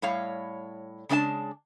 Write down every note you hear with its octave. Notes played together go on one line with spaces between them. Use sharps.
A2 G3 C#5 F5
C#3 G#3 D4 D5 A5